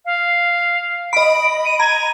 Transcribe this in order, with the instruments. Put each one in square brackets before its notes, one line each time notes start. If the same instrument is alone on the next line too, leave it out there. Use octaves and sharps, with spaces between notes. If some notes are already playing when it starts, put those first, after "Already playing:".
[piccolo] F5
[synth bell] D#5 B5 [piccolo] D7
[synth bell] D7 [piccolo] D#7
[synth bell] A#5 D#7 [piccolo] G#6